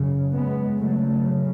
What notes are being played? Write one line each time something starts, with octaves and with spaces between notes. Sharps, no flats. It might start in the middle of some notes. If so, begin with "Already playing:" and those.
Already playing: F#2 C#3
G#3 B3
F#2 C#3 F#3 A3